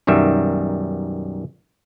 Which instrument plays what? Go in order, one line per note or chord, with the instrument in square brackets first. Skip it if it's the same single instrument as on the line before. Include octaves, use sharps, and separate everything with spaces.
[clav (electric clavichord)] B1 F#2 D#3 G3 E5